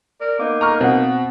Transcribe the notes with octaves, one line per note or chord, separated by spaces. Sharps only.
A#4 D5
A#3 B3 D#4 D6
A#5 C#6 F6
B2 C4 F#5